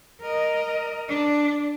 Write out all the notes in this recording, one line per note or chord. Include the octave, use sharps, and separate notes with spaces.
A#4 D#5
D4